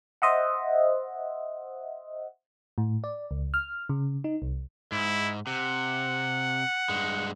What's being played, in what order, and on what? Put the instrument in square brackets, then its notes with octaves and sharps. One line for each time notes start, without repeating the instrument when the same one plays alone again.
[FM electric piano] C5 D#5 E5 F#5
A2
D5
C#2
F6
C#3
D#4
C2
[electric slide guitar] G#2 [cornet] E4
[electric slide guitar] C3 [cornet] F#5
[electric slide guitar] G2 G#3